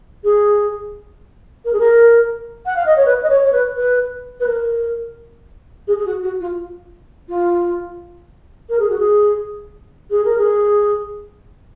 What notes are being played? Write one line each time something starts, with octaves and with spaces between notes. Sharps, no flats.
G#4
A#4
G#4
A#4
F#5
F5
D#5
C#5
B4
D#5
C#5
C#5
B4
B4
B4
A#4
G#4
G#4
F#4
F#4
F4
F4
A#4
G#4
F#4
G#4
G#4
A#4
G#4